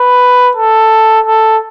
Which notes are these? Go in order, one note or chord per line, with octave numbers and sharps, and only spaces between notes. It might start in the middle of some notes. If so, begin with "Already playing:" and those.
Already playing: B4
A4
A4